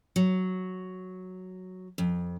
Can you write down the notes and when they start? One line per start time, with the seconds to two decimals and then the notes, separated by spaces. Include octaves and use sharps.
0.16 F#3
1.98 F2